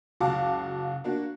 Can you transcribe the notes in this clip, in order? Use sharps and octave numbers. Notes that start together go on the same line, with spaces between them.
F#1 C#2 F#4 F5 A5 D6
A#3 D4 F#4